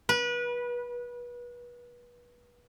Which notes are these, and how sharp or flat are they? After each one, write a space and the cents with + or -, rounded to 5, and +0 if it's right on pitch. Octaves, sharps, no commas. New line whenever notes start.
B4 -30